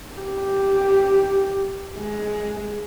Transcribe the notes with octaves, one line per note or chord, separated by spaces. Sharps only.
G4
G#3